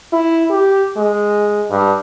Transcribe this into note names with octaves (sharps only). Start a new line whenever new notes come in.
E4
G4
G#3
G2